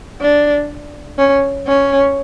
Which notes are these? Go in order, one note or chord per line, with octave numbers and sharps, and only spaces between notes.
D4
C#4
C#4